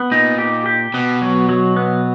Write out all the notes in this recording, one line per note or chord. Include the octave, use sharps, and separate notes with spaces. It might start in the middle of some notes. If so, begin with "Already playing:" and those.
Already playing: B3
A#2 D#4
G4
G4
B2 B3
F#3
F#3
B3